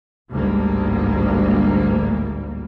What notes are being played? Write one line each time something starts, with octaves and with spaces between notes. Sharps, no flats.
A1 D2 G#2 G3 A#3